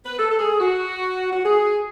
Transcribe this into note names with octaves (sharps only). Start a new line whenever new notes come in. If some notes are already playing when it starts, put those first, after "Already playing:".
B4
A4
A4
G#4
F#4
F#4
G#4